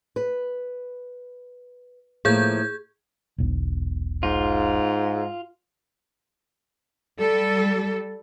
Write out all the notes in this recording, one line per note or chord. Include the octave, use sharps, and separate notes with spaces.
B4
A2 F3 A#3 G#4 G6 G#6
E1 B1
G#2 F4
G3 A4